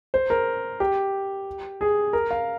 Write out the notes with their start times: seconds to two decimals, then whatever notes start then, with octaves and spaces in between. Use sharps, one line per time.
0.14 C5
0.30 A#4
0.80 G4
1.81 G#4
2.13 A#4
2.31 F5